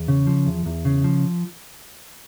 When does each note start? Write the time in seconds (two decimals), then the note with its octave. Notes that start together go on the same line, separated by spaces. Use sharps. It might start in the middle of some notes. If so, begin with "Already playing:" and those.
Already playing: E2
0.08 C#3
0.27 F3
0.46 E2
0.66 E2
0.85 C#3
1.04 F3